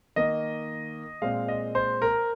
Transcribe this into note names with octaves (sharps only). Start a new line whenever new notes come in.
D#3 A#3 D#5
A#2 G#3 C4 F5
D#5
C5
A#4